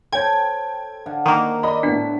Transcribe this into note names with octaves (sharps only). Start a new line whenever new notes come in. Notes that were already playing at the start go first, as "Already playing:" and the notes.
A4 C5 C#5 G5 G#5 G#6
D3 F5 F#5
D#3 A#3 A#4 D#5 G#5
D5 D#5 B5
A2 B3 D4 A5 B6